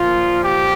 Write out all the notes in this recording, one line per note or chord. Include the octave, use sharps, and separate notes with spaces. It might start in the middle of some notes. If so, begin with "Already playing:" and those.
Already playing: A#2 F3 F4
G4